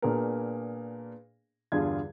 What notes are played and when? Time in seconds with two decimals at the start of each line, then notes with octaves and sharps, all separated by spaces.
0.02 A#2 B3 D4 G#4 A#4
1.72 E2 G2 D3 F4 G#4 G#6